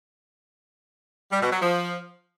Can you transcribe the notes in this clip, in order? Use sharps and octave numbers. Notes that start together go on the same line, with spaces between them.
G3
B2
F#3
F3